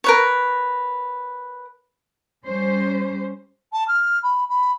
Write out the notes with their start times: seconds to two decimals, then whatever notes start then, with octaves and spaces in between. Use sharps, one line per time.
0.04 A#4 B4 C#5
2.45 G3 C#4 C5
3.72 A5
3.87 F6
4.23 B5
4.49 B5